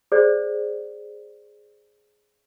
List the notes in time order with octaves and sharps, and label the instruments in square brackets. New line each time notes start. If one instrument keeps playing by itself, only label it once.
[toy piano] G#4 C5 D5